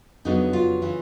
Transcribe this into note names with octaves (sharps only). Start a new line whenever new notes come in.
F2 C#3 F#3 B3 D4 D#4
F4
C#3 E3